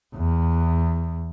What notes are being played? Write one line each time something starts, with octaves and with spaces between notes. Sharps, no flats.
E2